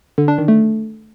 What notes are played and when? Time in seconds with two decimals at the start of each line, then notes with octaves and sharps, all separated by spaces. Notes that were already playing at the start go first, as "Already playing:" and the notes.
0.18 D3
0.28 D4
0.38 D#3
0.48 A3